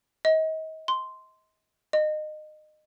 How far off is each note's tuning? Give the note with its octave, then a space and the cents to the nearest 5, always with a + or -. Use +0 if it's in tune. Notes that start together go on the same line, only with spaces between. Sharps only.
D#5 +35
C6 -5
D#5 -25